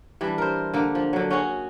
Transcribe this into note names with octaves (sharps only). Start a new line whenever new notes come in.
E3 G3 D4
A#4 C5
D3 A#3
F3
D3 F#3
C#4 F#4 G#4